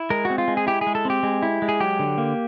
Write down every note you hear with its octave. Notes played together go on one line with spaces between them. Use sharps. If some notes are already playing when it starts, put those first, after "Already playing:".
Already playing: E4
G#3 A#4
F#4
C4
F4
G#3
G#4
E4 G4
G#4
G#3
A4
C4 G4
G#3
E4
G#3
G#4
F#3 G4
D3
A#3